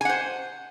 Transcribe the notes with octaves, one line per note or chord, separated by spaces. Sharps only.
C5 F#5 G#5